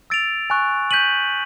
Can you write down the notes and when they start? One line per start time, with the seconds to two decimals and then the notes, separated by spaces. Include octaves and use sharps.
0.10 E6 A6 D7 F7
0.50 G#5 C#6 F#6
0.91 G6 B6 D#7 F#7